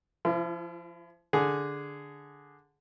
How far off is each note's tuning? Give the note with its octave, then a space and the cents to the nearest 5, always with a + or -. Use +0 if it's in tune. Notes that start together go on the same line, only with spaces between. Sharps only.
F3 -20 E4 +40
D3 +0 G#4 +0